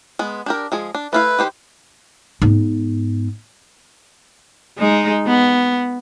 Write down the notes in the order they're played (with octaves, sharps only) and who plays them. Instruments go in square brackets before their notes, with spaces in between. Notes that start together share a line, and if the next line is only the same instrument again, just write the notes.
[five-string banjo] G#3 B3
D4 G4 A#4
F3 G#3 G#4
D4
[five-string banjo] A3 E4 F5 [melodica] B4
[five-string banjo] D#3 G4 C5
[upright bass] G#2 B3
[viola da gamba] G#3 D#4
B3